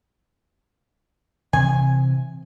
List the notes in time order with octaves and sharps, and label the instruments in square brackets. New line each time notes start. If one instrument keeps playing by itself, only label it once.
[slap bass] C3 E3 C4 [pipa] G#5